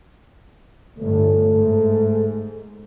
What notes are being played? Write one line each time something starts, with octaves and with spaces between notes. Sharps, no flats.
G1 A2 A3
G#2